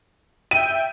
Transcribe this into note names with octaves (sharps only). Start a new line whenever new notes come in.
E5 G5 D#7